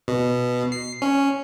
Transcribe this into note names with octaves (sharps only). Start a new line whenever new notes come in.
B2
C7
C#4